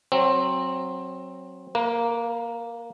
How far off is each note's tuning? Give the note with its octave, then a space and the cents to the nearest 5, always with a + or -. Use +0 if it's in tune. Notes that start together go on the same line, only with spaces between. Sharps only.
F#3 +0 C4 +15
A#3 +0 B4 -40